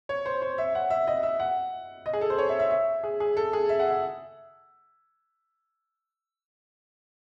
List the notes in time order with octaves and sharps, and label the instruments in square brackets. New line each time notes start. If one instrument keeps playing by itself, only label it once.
[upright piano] C#5
C5
C5
E5
F#5
E5
D#5
E5
F#5
D#5
G#4
A4
C5
C#5
E5
E5
E5
G#4
G#4
A4
G#4
E5
F#5
E5